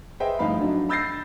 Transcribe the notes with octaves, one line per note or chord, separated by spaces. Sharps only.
G#4 B4 C5 D#5 E5 G5
G1 A2 F3 D#4 F5 B5
D3 F#3 D4 D#4
B5 E6 G6 A6 A#6 C7